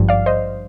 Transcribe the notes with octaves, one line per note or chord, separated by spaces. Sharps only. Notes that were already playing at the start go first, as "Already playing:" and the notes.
Already playing: G#1 G2 F3
D5 F5
C5 D#5